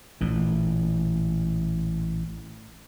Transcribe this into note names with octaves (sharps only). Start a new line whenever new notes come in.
A1 A#2